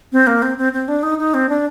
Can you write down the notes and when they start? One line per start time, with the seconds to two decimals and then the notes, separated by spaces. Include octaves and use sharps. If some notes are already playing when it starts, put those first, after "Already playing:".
0.12 C4
0.27 A#3
0.42 C4
0.58 C4
0.73 C4
0.88 D4
1.03 D#4
1.19 D#4
1.34 C4
1.49 D4